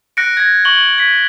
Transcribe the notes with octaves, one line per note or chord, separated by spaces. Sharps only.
F#6 A#6 C#7 D7
G#6 A#6
C#6 F#7 G7
G#6 B6